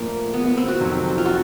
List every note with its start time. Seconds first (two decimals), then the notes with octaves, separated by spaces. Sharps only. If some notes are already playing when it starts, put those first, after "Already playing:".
Already playing: A#2 F3 A3 A#3 D4
0.34 B3
0.46 B3
0.57 C4
0.68 F#4
0.80 F2 C3 D#3 F#3
1.18 F4
1.26 F#4